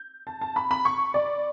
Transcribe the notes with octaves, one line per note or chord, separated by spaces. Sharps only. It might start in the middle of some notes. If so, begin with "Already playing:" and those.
Already playing: G6
A5
A5
B5
B5
C#6
D5